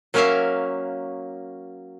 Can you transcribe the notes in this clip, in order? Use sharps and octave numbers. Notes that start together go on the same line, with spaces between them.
F#3 A#3 C#4 A#4 E5 F5